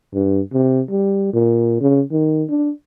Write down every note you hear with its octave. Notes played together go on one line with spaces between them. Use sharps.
G2
C3
G3
A#2
C#3
D#3
D4